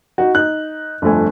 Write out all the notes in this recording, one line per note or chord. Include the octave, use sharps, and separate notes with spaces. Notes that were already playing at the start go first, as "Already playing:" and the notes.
D#4 F#4
D#4 F#6
G1 F2 A3 G#5